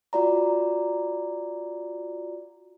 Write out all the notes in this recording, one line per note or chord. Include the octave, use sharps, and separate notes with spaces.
F4 F#4 D5 A#5